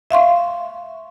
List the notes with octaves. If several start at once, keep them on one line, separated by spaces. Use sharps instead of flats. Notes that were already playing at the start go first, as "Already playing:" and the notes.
E5 F5 C6 C#6